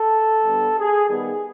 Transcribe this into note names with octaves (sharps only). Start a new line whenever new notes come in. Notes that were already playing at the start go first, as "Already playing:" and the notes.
Already playing: A4
D3 G3 B3
G#4
D#3 G3 B3 G#4